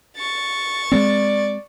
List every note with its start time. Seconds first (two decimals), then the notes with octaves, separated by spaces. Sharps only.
0.17 C#6 A6
0.92 G#3 A3 C4 D5